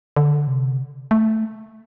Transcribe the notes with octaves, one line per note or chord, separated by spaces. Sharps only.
D3
C3
A3